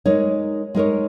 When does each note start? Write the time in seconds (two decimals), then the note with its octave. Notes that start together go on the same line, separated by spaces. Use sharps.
0.05 G#3 D#4 A#4 C#5
0.74 G#3 D#4 A#4 C#5